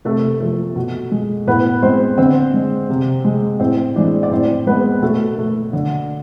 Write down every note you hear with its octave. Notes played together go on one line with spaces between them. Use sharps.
C3 A3 A4
F3 A3
B2
G#3
A2 B3 B4
G#3 C4 C5
D3 C4 C5
G#3
C3
G#3
A2 C4 C5
E3 G#3 D4 D5
D5
A2 C4 C5
G#3 B3 B4
B2 A3 A4
A3
D3